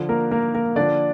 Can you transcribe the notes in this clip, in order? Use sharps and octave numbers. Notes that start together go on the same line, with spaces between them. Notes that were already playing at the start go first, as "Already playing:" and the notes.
Already playing: D3 F3
A#3 A#4
A#3 A#4
A#3 A#4
D3 F3 D4 D5